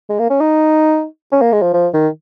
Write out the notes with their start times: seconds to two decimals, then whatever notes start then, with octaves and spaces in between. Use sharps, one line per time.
0.09 G#3
0.19 A#3
0.30 C#4
0.40 D#4
1.32 C#4
1.42 A#3
1.53 G#3
1.62 F3
1.74 F3
1.94 D#3